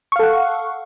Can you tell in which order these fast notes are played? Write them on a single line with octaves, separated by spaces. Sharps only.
C#6 F5 A4 F#5